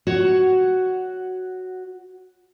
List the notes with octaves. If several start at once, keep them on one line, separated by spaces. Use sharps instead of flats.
F#4 C#5